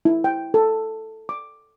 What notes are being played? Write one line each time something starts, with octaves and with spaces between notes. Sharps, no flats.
E4
G5
A4
D6